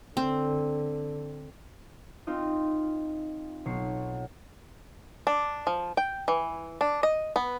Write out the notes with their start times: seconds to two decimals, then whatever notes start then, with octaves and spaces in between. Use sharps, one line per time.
0.17 D3 C4
2.27 C4 D#4 F4 D#5
3.65 B1 C#5 C#6 C7
5.27 D4
5.67 F3
5.97 G5
6.28 E3
6.81 D4
7.03 D#5
7.36 B3